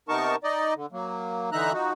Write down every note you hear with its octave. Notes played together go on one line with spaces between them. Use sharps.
C3 B3 D#4 A#4 A5 C#6
D#4 D5 D#5
D3
F#3 A#3
D3 E3 D#4 E5 A#5 F#6
F3 D#4 F#4